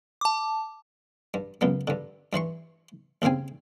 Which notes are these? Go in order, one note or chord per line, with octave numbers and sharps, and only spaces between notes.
A5 D6
G2
C#2 F#2 B3
G2 D3
G2 E3 C6 C#6
D#2 C#3 G3 C4 G#5